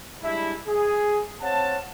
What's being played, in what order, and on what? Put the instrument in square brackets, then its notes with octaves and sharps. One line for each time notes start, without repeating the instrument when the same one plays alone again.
[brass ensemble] G3 G#3 D4 E4
G#4
C4 C#5 F5 F#5 A5